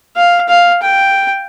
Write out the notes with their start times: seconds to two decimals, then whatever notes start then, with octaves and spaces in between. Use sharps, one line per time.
0.16 F5
0.49 F5
0.83 G5